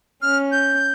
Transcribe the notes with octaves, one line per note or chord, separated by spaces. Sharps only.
C#4 F6
G6